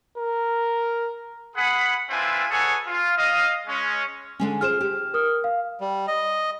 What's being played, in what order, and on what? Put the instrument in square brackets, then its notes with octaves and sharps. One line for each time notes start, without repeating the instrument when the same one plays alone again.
[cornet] A#4
[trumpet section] G#4 F#5 B5
C4 D4 F4 B4 E5 G#5
G#4 A4 B4 C#5 F#5 G#5
F4
D#5 F5
G#3 C#4
[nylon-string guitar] D3 G#3 C#4
[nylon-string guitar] F4 G#4 C5 [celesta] F6 E7
[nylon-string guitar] G4
[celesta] A#4 D#6 F6
F5
[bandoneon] G3
D#5